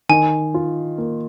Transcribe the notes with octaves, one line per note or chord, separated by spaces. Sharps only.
D#3 G#5
F4
A#3